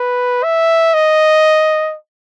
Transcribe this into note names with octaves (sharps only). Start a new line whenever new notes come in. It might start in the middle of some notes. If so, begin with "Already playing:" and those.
Already playing: B4
E5
D#5